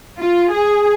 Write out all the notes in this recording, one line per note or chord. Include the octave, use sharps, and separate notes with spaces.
F4
G#4